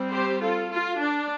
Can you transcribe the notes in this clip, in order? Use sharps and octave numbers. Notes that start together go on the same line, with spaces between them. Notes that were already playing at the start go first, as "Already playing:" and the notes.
Already playing: G3 C4
G4 C5
F4 A4
F4
D4